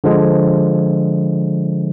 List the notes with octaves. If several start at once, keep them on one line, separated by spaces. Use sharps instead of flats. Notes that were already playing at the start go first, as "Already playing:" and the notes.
D3 F3 G#3